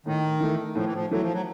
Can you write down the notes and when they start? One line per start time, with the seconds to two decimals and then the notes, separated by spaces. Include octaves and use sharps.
0.06 A2 D#3
0.41 E3 A3
0.75 A2 F3
0.85 E3
0.94 F3
1.11 E3 F#3 A3
1.22 F3
1.33 F#3